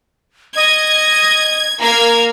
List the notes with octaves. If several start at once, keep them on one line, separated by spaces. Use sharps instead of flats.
D#5 G#6
A#3 F5 A#5 G#6